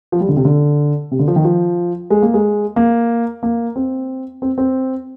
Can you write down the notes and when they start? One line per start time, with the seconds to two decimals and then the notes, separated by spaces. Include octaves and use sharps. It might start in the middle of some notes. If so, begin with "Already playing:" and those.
0.12 F3
0.20 G3
0.29 D3
0.36 C3
0.45 D3
1.11 C3
1.19 D3
1.28 F3
1.36 D#3
1.45 F3
2.10 G#3
2.22 A#3
2.34 G#3
2.76 A#3
3.43 A#3
3.76 C4
4.42 C4
4.58 C4